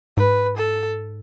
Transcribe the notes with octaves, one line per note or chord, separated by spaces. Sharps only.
G#2 B4
A4